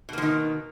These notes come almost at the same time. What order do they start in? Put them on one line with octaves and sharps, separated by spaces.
B2 A#3 F3 D#3